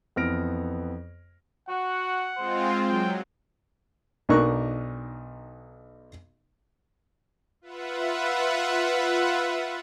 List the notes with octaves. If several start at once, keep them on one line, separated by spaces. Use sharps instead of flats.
F2 E3 B3 F6 A#6 D7
F#4 F#5
G#3 C4 F4 C5
F#3 G5
B1 D4 D#4 A#4 C#6 F#6
F4 B4 E5 F#5